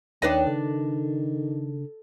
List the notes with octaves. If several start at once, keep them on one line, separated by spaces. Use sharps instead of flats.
D#2 D#3 D4 B4 C#5 D#5 G5
C#3 A4